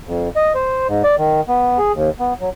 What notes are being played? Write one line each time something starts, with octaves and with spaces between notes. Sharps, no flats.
F2
D#5
C5
G#2
D5
D#3
B3
G#4
D#2
B3
F#3